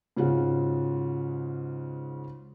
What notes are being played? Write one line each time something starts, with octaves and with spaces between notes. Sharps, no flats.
G#2 C#3 F4 F#4